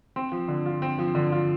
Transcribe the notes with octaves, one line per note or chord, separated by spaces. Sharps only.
C4
F3
D3
F4
C4
F3
D3
F4